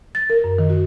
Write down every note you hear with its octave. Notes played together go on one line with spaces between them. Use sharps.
A6
A#4
F#2
D#3
F#4